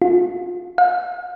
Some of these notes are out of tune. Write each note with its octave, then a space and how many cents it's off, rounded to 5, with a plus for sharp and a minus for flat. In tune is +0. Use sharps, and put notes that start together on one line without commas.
F4 +30
F5 +45